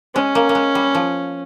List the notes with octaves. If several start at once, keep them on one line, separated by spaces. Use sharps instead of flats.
G#3 C#4
A#3
A#3
G#3
G3
F3